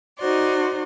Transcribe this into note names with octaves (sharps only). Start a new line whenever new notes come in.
D#4 F#4 C5 D5